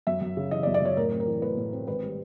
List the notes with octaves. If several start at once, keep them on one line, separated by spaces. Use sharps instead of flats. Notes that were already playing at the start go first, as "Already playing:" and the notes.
F#2 E5
F#2
C#3
E3 D#5
D5
F#2
D5
F#2 C#5
A2 A#4
C4
A#4
E3
A3 B4
A2
C4
G#1 B4
G3